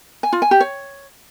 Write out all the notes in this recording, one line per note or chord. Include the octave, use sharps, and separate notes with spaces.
G#5
F4
G#5
G4
C#5